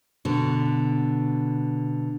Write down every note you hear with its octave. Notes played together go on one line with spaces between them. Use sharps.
B2 D3